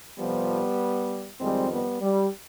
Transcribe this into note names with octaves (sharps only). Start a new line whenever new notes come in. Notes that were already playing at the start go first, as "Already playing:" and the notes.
F2 C3 F3 G3 B3
F2 D#3 G3 G#3 C4
G3 B3
G3